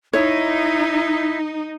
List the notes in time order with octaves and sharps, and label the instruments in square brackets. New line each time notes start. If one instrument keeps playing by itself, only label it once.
[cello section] D#4 [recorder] E4 [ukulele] C#5